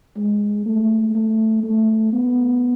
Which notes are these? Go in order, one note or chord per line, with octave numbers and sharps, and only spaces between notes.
G#3
A3
A3
A3
B3